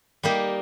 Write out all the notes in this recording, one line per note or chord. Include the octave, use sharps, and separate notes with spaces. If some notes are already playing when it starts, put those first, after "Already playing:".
G3 A#3 D#4 G4